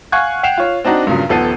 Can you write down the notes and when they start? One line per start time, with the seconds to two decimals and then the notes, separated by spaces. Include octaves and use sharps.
0.12 F5 F#5 G#5 C#6 F#6 G#6
0.43 F#5 G5 C7 E7 F7
0.58 F4 C#5
0.85 C4 D4 D#4 F#4
1.07 G2 A#2 C#3 F#3
1.29 D#1 F3 B3 A4 C7 D#7